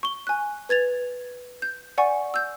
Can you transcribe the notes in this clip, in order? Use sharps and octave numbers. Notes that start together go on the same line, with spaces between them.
C#6 G7
G#5 F#6
B4 G#6 A6 F7
G6
D5 F#5 G#5 C#6
E6 G6